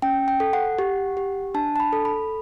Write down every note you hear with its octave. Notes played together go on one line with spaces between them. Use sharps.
C#4 G5
G5
A4
F#5
G4
G4
D4 A5
A5
B5
A4
B5